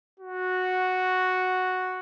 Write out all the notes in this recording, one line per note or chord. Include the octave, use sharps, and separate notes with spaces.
F#4